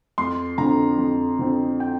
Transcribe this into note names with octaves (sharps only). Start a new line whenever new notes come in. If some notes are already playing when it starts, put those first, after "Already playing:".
F2 C6
D3 F3 C4 A#5
F2
D3 F3 C4
G5